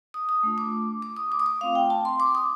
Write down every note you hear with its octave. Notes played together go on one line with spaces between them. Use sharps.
D#6
D#6
A3 D4 F4
D6
D6
D#6
D6
D#6
D6
A3 C4 F4 F5
G5
A5
C6
D6
D#6